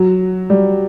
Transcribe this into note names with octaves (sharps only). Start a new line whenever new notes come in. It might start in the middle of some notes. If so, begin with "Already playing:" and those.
Already playing: F#3
G3